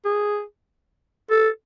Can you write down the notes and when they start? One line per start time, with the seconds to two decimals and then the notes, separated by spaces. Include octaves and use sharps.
0.05 G#4
1.30 A4